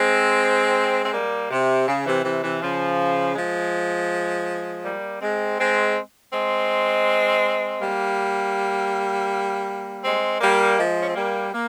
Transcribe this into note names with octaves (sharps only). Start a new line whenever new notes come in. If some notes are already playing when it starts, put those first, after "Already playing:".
Already playing: G#3 C4
C4
G3 A#3
C3
C#3
C3 E3
C3 E3
C3 E3
C#3 F3
F3 G#3
G3 A#3
G#3 C4
G#3 C4
G#3 C4
G3 A#3
G#3 C4
G3 A#3
F3 G#3
C#4
C4
G3 A#3
A#3